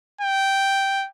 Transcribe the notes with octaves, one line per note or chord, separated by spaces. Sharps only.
G5